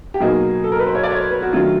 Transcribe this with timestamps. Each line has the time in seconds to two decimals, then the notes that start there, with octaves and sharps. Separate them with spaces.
0.14 G4
0.20 B2 F#3 A#3 D#4 G#4
0.64 A4
0.72 A#4
0.79 B4
0.86 C5
0.95 C#5
1.03 D5
1.12 C#5
1.20 C5
1.31 B4
1.42 F#4
1.53 D#3 F#3 A3 D4 F4